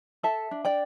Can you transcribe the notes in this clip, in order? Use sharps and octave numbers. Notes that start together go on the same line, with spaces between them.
A4 E5 A5
D4
D5 G5